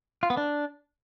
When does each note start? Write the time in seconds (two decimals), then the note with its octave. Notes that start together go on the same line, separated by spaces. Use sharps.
0.23 F4
0.30 B3
0.37 D4